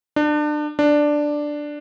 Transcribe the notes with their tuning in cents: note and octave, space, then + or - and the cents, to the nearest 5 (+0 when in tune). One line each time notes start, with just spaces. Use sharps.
D4 +30
D4 +5